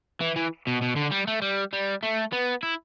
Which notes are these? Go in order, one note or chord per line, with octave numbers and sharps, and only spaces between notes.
E3
E3
B2
B2
D3
G3
A3
G3
G3
A3
B3
E4